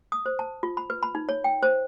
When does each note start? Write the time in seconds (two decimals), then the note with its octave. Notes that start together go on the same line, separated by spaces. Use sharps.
0.12 D#6
0.26 C5
0.39 A5
0.63 F4
0.77 B5
0.90 B4
1.03 B5
1.15 D#4
1.29 C#5
1.44 G5
1.63 C5